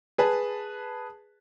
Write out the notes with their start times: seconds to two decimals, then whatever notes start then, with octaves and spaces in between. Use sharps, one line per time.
0.18 G#4 B4 A5